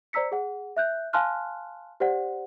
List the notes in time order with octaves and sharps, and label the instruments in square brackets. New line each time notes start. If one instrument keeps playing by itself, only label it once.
[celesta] C5 D5 A#5 E6 B6 C#7
G#4 F#5
E5 F#6 G6
F5 G#5 A5 C6 F6 F#6
G4 C5 D5 F#5